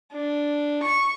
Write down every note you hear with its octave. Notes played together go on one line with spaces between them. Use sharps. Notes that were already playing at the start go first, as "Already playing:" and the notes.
D4
C#6